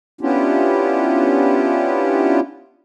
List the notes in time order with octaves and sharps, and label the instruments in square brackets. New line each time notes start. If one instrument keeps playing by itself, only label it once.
[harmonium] B3 C#4 D4 E4 F4 G4